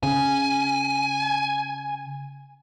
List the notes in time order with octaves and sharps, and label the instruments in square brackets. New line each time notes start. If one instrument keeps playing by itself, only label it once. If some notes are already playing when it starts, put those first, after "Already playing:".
[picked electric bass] C#3 [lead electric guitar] G#5